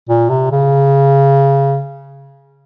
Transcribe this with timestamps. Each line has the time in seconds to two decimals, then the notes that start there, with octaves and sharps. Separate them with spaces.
0.09 A#2
0.30 C3
0.52 C#3